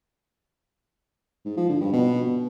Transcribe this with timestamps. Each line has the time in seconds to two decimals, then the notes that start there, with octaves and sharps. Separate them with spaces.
1.45 G#2
1.57 F3
1.69 D3
1.81 G2
1.92 B2